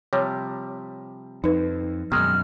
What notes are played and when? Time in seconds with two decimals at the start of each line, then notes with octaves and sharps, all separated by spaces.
0.13 C3 F3 G3 C#5
1.44 F2 D#4 B4
2.12 F#2 B2 D#3 G#3 F6